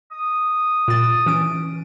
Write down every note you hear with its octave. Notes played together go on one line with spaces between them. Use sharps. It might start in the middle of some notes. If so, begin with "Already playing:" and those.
D#6
A#2 A6
E3 C#4 D7